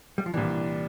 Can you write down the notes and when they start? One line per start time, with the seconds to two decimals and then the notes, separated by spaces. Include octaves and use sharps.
0.18 G3
0.26 F3
0.34 C2 A#2 E3 G3 D4